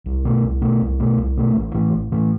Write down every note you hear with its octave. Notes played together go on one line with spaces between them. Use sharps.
C2
B2 A3
C2
B2 A3
C2
B2 A3
C2
B2 A3
A1
A2 E3 A3
A1
A2 E3 A3